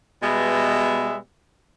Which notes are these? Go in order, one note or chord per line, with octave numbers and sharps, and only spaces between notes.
B2 G3 G#3 B3 E5